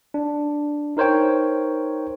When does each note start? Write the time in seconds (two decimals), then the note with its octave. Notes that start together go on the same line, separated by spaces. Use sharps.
0.14 D4
0.97 D#4 A#4 C5 C#5 G5